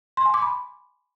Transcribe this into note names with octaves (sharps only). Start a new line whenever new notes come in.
C6
G#5
D6
B5